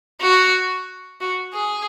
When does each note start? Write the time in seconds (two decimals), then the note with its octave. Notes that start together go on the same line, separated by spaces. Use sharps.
0.21 F#4
1.21 F#4
1.54 G#4